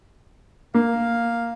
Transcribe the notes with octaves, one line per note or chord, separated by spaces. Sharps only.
A#3 F5